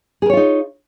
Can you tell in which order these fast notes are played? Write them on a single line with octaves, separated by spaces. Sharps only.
G#4 A#4 C#5 F4 D#4